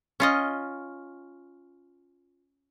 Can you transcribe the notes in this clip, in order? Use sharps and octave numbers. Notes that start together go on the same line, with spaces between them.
C#4 F4 D#5